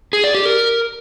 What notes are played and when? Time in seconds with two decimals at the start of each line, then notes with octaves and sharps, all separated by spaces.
0.13 G#4
0.24 D5
0.35 G4
0.45 A#4